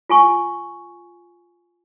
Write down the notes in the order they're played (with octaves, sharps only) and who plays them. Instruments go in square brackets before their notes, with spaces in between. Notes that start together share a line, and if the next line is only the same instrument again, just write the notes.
[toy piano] F4 G#5 C#6